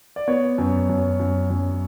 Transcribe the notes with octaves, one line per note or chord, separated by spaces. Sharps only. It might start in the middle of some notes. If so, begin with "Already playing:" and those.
D5
B3 C#5
F#2
F#2
F#2
F#2